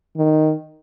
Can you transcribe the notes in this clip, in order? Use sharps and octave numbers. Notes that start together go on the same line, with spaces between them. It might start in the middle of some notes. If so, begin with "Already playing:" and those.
D#3